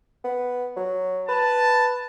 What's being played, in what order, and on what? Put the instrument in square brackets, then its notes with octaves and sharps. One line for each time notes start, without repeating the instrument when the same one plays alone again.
[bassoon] B3
F#3
[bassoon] B4 [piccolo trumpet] A5